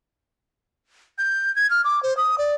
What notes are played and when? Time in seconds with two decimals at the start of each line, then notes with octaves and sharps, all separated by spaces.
1.18 G6
1.56 G#6
1.70 F6
1.84 D6
2.03 C5
2.17 D#6
2.38 D5